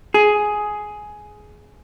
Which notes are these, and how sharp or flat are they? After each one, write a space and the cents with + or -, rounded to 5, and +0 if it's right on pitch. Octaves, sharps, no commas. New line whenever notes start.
G#4 +10